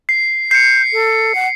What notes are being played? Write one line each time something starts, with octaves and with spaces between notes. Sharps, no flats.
C7
G6 C7 C#7
A4
F#5